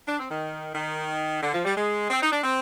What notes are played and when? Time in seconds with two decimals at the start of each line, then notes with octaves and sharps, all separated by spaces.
0.08 D4
0.19 C4
0.30 D#3
0.75 D#3
1.43 D3
1.54 F3
1.65 G3
1.76 G#3
2.10 C4
2.22 D#4
2.32 D4
2.44 C4